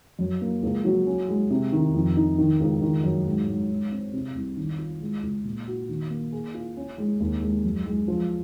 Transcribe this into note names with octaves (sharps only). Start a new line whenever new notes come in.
F#2
A#3
C#2
F#3
C#4
G#3
C3
D#3
F2
D#4
D#3
C#2
D#3
F#2
G#2
G#2
G#2
C4
C3
C2
D#3
F4
G#3
C#2
A#2
F#4
D#3
A#3
G#4
F4
C#4
G#3
D#2
G#3
F#2
G#3
F3